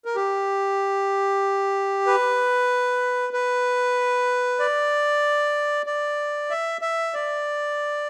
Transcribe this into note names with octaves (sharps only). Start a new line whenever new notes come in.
A#4
G4
B4
B4
D5
D5
E5
E5
D5